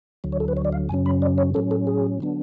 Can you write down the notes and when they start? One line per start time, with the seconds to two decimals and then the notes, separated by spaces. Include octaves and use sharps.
0.24 D2 D3 F#3
0.32 C#5
0.40 A4
0.48 B4
0.57 C#5
0.65 D5
0.72 F5
0.89 F#2 C#3 F#3 C#4 G#5
1.06 B5
1.22 D5
1.38 C#5
1.54 A2 F#3 C#4 A4
1.71 A4
1.87 G#4
2.20 D3 F#3 B3 D4